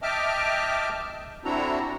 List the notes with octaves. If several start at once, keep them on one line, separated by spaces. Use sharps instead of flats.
D#5 E5 G5 A5 D6 F6
C4 D4 E4 F#4 A4 A#5